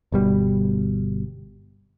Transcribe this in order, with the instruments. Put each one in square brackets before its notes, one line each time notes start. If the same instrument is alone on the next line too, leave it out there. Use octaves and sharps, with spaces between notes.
[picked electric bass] G1 B2 G3